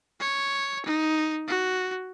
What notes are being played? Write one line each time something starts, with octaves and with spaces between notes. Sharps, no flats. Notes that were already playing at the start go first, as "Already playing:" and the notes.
C#5
D#4
F#4